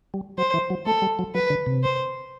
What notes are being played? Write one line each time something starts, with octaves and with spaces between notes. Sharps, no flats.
G3
F#3 C5
E3
F#3
A3 A4
G3
F#3
F#3 B4
D3
C3
C5